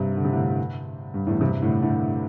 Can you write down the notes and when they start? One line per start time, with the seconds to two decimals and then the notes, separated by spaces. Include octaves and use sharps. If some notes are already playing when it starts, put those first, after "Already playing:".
Already playing: G2 C3
0.17 D3
0.25 C3
0.33 A2 D3
1.14 G2
1.27 E2 A2
1.41 G2 C3
1.62 A2 D3
1.82 A2 D3